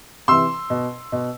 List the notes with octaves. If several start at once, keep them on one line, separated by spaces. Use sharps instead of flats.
C3 E3 C6 E6
B2
B2